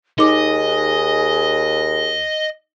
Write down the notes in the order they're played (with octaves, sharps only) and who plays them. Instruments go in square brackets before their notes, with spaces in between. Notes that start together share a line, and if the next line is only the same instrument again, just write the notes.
[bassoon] D#2 [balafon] D#4 D6 [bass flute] G#4 [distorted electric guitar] D#5